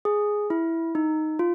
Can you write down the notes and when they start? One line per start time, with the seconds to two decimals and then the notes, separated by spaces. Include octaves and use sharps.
0.05 G#4
0.50 E4
0.95 D#4
1.39 F4